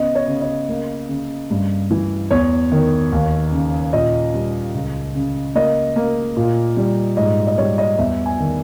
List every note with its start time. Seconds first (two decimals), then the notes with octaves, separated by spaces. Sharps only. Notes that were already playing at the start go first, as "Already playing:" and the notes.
Already playing: C#3 B3 D#5
0.15 C#5
0.28 C#3
0.41 D#5
0.69 A#3
1.09 C#3
1.50 G2
1.91 E3
2.31 E2 C#5
2.72 D#3
3.12 D#2
3.52 C#3
3.93 A#2 D#5
4.34 G3
4.75 C#2
5.15 C#3
5.55 A#3 D#5
5.96 A#3
6.37 A#2
6.77 G3
7.17 G#2 D#5
7.47 D#5
7.58 G3 C#5
7.78 D#5
7.98 E2 E5
8.26 G#5
8.40 D#3